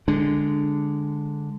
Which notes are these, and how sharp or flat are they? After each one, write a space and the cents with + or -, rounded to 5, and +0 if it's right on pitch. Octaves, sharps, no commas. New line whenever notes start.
D3 +0 G#3 -10 D4 +0